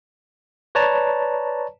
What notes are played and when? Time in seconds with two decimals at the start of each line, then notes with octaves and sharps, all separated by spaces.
0.75 B4 C#5 D5 A5 A#5